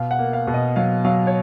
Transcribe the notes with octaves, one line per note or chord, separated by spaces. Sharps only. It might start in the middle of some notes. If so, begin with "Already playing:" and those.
Already playing: B2 F5
F#5
A#3
F5
B2
D#5
F#3 F5
F#3 F5
C#5